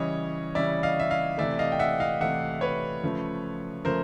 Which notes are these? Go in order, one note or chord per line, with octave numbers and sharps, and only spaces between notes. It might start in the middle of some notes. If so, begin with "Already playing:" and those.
Already playing: C#3 E3 G3 C#5 D#5
C#3 E3 G3 D5 E5
D#5 F5
E5
D#5 F5
C3 E3 A3 D5 E5
D#5 F5
G5
E5 F#5
D#5 F5
C3 E3 A3 E5 F#5
B4 C#5
C#3 F3 A3
C#3 F3 A3 A#4 C5